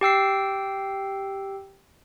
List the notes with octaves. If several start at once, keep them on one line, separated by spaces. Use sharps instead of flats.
G4 G5 E6 C7